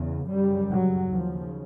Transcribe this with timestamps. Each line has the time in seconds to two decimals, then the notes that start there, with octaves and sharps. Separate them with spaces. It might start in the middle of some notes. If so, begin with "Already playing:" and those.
Already playing: E2 C#3
0.26 F#2 C#3 G3
0.70 F#3
1.13 D#2 C#3 F3